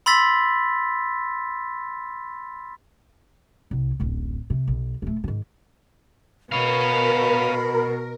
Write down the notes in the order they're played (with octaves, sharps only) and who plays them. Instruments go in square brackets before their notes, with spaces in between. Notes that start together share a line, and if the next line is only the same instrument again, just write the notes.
[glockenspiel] B5 C6 E6 A6 B6
[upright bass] C2
D1 A1
C3
B1
D#1 A3
G#2 D#3
[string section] B2 [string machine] A#4 [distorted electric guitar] C#5 F5 [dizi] B5